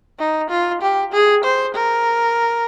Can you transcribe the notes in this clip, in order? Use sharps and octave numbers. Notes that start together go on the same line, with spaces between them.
D#4
F4
G4
G#4
C5
A#4